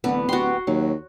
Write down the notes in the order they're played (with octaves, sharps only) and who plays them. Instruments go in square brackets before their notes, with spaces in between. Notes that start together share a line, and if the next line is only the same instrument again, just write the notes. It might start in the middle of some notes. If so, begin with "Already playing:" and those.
[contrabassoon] D1 [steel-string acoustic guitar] D3 E3 [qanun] B3
[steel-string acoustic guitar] B3 G4 [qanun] F#4 C6
[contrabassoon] D#2 [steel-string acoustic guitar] F#3